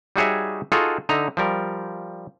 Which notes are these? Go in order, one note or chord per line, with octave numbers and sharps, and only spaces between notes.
G3 D#4 F#4 G#4 C#5 E5
D#4 F4 F#4 G#4 A4
D3 D#4 E5 A#5
F3 G3 A#4